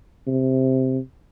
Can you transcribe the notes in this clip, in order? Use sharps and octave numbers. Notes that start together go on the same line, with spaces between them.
C3